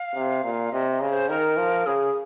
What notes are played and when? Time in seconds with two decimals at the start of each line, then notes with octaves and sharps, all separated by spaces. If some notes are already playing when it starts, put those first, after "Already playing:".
Already playing: F5
0.15 C3
0.44 A#2
0.72 C3 D#5
0.91 D#5
1.01 C#3
1.10 C5
1.29 D#3 A#4
1.57 F3
1.87 C#3 G#4